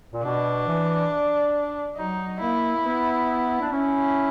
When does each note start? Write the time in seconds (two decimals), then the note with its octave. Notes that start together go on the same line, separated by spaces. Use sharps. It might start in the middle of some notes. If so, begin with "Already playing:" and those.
0.12 A#2
0.23 B2 D4
0.66 E3
1.97 F#3 D#4
2.40 A#3 E4
2.75 A#3
2.84 B3
3.60 D4
3.71 C#4 E4